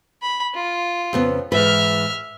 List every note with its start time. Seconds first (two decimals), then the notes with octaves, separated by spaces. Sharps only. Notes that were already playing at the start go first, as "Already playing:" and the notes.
0.22 B5
0.55 F4
1.13 F2 C#3 B3
1.52 G#2 E3 B4 E5 F6